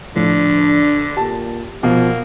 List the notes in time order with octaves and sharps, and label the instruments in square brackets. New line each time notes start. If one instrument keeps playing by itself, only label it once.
[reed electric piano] A2 F3 [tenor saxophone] D3 [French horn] D4
[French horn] A#2 [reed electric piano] G4 [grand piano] A5
[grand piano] B2 [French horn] F3 [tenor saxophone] A#3